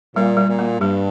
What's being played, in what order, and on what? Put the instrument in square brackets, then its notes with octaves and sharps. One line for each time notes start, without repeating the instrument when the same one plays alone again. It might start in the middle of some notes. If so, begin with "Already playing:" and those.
[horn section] A#2 [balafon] G3
[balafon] G3
[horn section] A#2
[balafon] A#3
[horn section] G2 [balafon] G3